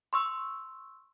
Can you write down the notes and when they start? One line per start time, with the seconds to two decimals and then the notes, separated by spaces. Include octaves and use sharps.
0.13 C6 C#6 E6